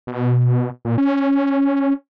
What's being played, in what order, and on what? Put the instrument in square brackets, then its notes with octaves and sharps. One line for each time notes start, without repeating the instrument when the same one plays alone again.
[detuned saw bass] B2
A#2
C#4